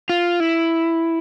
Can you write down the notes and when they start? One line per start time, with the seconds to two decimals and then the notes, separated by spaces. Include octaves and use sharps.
0.09 F4
0.40 E4